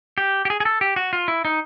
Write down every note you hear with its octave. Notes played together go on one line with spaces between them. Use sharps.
G4
G4
G#4
G#4
A4
G4
F#4
F4
E4
D#4